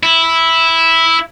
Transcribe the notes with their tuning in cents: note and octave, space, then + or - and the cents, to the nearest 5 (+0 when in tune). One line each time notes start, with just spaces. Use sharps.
E4 -5